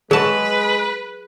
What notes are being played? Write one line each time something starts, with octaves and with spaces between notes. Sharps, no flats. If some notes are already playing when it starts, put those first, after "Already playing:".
F#3 G#3 G#4 B4 A5